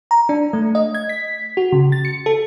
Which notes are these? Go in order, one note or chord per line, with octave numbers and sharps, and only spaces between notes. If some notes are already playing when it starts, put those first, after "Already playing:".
A#5
D4
A3
D#5
G#6
B6
F#4
C#3
A6
C#7
A4